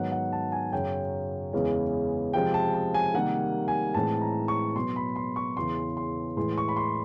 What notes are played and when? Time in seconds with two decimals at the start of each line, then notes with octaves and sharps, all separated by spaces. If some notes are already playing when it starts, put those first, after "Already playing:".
Already playing: G#2 D#3 F#3 B3 F#5
0.12 F#5
0.33 A5
0.52 G#5
0.72 F#2 C#3 F#3 G5
1.53 E2 C#3 E3 G#3 C#4
2.33 C3 F3 G#3 C4 G5
2.54 A5
2.74 A5
2.94 G#5
3.14 C3 D#3 G3 A#3 F#5
3.68 G#5
3.94 A2 E3 G#3 C4 A5
4.21 A#5
4.48 C#6
4.75 B2 F#3 B3 C6
4.96 B5
5.16 C6
5.36 C#6
5.57 E2 C#3 E3 C6
5.97 C6
6.37 A2 E3 G#3 C6
6.58 C#6
6.68 B5
6.76 C6